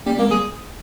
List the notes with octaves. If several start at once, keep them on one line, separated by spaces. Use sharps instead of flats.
G3 A#3 C#4
G#3 A#3 C4
G3 A#3 G#4